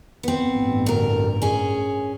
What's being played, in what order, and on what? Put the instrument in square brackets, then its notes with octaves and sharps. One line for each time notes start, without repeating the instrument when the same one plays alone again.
[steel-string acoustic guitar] B3 C4
[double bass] A1 G2
[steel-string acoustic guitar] D2 A#4
C#4 G#4